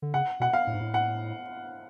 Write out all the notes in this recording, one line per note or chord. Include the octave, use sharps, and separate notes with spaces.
D3
C#3 F#5
B2 F#5
F5
A2
G#2
A2
F#5